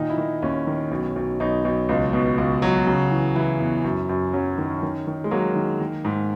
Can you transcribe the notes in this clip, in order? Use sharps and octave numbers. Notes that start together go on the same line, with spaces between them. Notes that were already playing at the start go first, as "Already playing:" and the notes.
Already playing: A#2 D#3 D#4
E4
D#3
D#2 C#4
D#3
B1
B1
B1 D#4
B1
C#2
B2
C#2
F#3
C#3
E3
E3 E4
E2
F#2
F#2
F#3 C#4
D#3
D#3
D#3
G#3
F#3 A#3
D#3
D#3
G#2